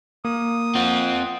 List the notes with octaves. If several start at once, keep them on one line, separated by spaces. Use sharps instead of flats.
A#3 D#6
C4 F4 F#5